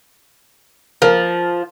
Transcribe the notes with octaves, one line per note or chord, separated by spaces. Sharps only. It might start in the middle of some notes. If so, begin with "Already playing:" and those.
F3 A#4